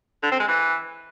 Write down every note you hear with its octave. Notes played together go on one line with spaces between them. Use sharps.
D3
C4
G#3
E3